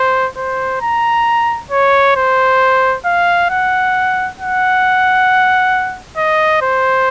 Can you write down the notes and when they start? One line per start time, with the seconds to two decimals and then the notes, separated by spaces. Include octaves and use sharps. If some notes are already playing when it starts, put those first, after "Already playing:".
Already playing: C5
0.37 C5
0.82 A#5
1.71 C#5
2.16 C5
3.05 F5
3.50 F#5
4.39 F#5
6.17 D#5
6.62 C5